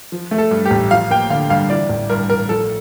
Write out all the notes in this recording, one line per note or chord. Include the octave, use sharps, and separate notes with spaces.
F3
A3
A4
G2
G4
A1
F3 F5
A#3 G5
D3 F5
G2 F5
E3 D5
A1
G2 A#4
A1 A#4
F3 A4